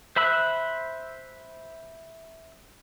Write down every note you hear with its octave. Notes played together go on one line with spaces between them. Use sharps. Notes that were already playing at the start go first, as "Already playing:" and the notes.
C5 E5 B5 E6 F#6